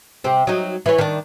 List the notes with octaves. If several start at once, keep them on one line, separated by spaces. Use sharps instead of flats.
C3 C4
F#3 D#4
E3 C#5
D#3 D4